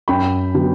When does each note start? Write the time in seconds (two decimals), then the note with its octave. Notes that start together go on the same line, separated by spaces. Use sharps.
0.08 F#2 G5 B5
0.54 D3 F#3 B3